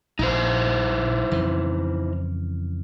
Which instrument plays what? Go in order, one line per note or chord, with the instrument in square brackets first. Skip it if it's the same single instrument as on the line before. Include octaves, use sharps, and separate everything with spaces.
[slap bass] A#1 [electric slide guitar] D#4 E4 C5
[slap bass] F2 C#3 E3